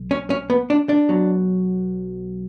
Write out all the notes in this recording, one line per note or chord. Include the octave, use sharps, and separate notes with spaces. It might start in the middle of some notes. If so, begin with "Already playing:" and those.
Already playing: B1
C#4
C#4
B3
D4
D4
B1 B2 F#3